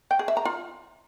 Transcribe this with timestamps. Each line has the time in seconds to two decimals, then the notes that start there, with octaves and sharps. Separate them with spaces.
0.11 G5
0.19 G#4
0.28 E5
0.37 A#5
0.45 F4